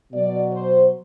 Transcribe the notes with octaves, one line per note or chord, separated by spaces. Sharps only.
B2 F#3 D5
C5